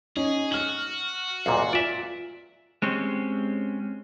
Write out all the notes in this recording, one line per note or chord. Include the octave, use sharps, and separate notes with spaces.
C#4 D#4 G#4
F#4 F6 F#7
B1 E2 A#2 F5 G#5
F4 D5 E5
G#3 C4 C#4 G4